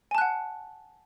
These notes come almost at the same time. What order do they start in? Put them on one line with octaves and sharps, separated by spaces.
G#5 A5 F#6 F#5